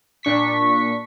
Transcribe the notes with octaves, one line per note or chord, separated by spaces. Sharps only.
A#2 D4 C#6 B6